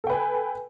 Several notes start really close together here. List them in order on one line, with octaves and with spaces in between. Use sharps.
A4 G5 B4 G#5